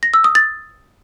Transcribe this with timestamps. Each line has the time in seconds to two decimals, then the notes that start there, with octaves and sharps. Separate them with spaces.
0.03 A#6
0.14 E6
0.24 D#6
0.35 A6